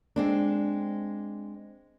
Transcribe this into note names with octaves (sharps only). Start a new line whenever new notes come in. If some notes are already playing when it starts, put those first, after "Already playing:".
G#3 C4 D4